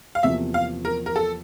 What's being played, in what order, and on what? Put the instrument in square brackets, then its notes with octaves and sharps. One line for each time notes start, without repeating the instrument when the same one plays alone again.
[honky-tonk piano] F5
[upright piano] E2 C3 F3 A#3 [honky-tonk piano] E5
[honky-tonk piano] F5
A#4
A#4
A4